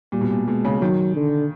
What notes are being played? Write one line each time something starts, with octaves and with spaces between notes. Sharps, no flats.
A#2 G3
B2
A#2
B2 G#3
C#3
D#3 F#3
D3